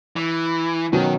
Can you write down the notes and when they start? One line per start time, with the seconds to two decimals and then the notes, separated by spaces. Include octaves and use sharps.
0.16 E3
0.93 B2 D#3 F#3 C#4